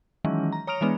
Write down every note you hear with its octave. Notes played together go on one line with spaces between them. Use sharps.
D#3 E3 F#3 G#3 C#4 E4
A#5
C#5 A#5 D#6 F6 D7 F7
E3 G#3 B3 D4